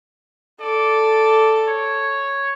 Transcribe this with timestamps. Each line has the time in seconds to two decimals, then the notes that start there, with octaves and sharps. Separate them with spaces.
0.60 A4 D5
1.68 C#5